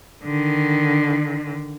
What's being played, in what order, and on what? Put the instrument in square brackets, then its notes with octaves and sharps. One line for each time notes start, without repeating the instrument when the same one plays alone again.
[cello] D3 D#3